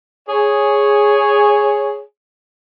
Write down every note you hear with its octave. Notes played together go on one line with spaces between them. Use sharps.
G#4 C#5